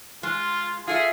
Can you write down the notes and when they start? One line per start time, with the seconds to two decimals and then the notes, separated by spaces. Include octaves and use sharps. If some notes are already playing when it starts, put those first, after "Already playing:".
0.23 G#3 F4
0.88 F4 G#4 A4 E5